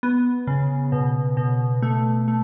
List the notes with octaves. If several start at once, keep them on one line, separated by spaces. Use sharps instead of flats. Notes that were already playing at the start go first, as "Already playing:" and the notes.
B3
C#3
B2
B2
A3
A3